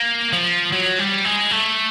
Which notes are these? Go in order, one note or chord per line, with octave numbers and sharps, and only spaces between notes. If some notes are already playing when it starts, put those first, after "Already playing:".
Already playing: A#3
F3
F#3
G3
G#3
A3